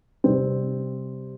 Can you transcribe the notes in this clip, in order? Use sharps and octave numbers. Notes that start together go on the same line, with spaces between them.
C3 G3 C4